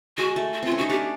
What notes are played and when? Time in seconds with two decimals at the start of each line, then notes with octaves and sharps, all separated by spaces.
0.18 G#3 F#4
0.36 A3
0.53 F#4
0.63 C4 F4
0.72 C#4
0.78 F#4
0.81 D#4
0.89 D4 G4